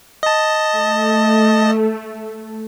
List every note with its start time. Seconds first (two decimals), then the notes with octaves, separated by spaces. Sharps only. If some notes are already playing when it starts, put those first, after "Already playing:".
0.23 D#5 A5
0.75 A3